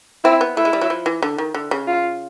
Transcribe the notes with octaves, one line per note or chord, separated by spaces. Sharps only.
C4 E4
B3
A3 E4
G#3
G3
F#3
F3
E3
D3
D#3
D3
C#3
F4